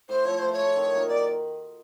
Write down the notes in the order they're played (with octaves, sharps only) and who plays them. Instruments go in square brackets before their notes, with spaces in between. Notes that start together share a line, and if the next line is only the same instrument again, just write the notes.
[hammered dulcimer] A2 [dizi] C5
[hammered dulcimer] F3 A3 [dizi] C#5
[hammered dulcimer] A2 [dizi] C5
[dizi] C#5
[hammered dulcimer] F3 A3
D#3
F#3 A#3 D#4
[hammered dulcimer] D#3 [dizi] D5